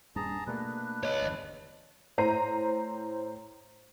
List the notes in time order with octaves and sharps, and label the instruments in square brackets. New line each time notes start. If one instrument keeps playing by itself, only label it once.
[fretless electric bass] D#1 G2 D4 [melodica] G#4 A5 A#5
[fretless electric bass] B2 A3 A#3 [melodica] D4 B4
[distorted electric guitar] C#5 D#5
[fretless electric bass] G1 E2
[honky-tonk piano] A2 C5 A#5 G6 C7 D#7